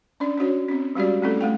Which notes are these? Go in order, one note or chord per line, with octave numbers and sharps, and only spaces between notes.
C#4 D4 D5
C#4 D4 F#4 C#5
C4 C#4
G3 G#3 C#4 F#4 G4 D5
A3 C4 C#4 E4 A4
A3 F5 G5